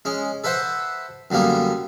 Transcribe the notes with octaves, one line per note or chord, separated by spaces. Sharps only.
G#3 C#4
A4 B4 C5 E5 F#5
F#2 D3 G3 A#3 B3